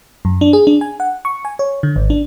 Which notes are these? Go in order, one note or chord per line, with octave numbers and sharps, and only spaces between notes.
F#2
D4
G#4
D4
G#5
F#5
C#6
G#5
C#5
D3
G#1
D4